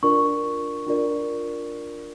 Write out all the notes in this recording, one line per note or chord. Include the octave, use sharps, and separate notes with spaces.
D4 F4 A#4 D5 C#6
D4 F4 A#4 D5